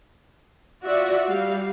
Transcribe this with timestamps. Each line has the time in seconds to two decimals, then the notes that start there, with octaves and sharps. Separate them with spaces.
0.84 F4 F#4 D5 E5
1.28 G3 F5